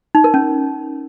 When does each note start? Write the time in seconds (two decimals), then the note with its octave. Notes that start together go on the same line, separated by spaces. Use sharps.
0.15 D#4
0.24 A#4
0.34 C#4